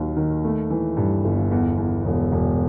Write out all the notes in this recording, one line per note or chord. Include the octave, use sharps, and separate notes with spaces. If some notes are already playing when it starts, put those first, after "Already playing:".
Already playing: D#2 D#3 F#3
D#3
A3
E3
G2
G1
E2
E2
E1
E1